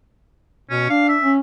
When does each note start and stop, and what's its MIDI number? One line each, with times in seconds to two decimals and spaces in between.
0.70 0.85 47
0.70 0.88 61
0.89 1.17 62
0.89 1.05 77
1.08 1.32 76
1.22 1.39 61